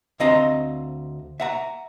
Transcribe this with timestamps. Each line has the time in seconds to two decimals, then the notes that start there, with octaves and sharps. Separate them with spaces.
0.20 D2 C4 D#5 F5 A#5
1.40 E5 F#5 A#5